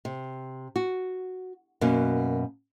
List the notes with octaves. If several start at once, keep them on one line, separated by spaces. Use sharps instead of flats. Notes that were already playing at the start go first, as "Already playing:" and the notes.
C3
F#4
F#2 B2 A#3 C#4